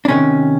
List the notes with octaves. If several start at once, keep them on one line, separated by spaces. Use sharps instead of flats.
D4
C3 D#3 C#4